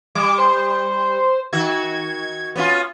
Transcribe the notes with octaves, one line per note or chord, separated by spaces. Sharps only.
G3 D6
C5
D#3 F#4 G#6
B3 C#4 F4